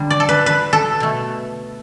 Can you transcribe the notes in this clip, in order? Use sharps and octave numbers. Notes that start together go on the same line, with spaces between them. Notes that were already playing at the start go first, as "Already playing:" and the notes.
Already playing: D3 G3
D5
A4
B4
B4
A4
B2 A3